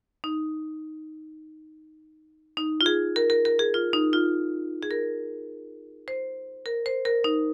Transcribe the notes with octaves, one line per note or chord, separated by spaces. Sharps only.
D#4
D#4
F4
G#4
A#4
A#4
A#4
G#4
F4
D#4
F4
G#4
A#4
C5
A#4
C5
A#4
D#4